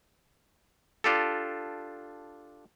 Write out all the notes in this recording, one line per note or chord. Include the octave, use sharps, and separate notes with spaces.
D4 F4 G4 A4